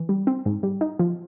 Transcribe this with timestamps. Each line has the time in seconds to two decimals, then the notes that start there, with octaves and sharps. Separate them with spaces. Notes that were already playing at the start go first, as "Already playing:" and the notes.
Already playing: E3
0.09 G3
0.27 C4
0.45 G#2
0.63 G3
0.81 D#4
0.99 F3